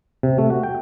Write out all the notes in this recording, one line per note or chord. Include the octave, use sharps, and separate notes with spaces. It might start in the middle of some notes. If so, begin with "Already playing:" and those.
C3
A3
F#4
G5